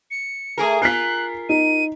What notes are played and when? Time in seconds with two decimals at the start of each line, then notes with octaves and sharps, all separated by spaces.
0.11 C#7
0.58 A3 G#4 A#4
0.82 F4 A#4 F#6 B6 C7
1.49 D#4 D#7